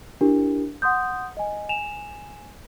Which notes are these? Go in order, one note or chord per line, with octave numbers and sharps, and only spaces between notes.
D4 E4 G4 A#4
F#5 C6 D#6 G6
D#5 G#5
G#5 E7 F7